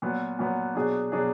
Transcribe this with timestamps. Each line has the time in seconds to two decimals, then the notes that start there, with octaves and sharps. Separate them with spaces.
0.02 A#2 F#3 B3
0.39 A#2 F#3 B3
0.75 B2 F#3 D4 G#4
1.12 B2 F#3 D4 G#4